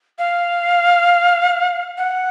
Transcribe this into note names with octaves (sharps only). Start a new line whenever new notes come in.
F5
F#5